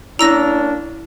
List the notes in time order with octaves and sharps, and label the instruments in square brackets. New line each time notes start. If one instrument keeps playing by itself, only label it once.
[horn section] A#3 C#4 D4 [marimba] E4 [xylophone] A#5 E6 A#6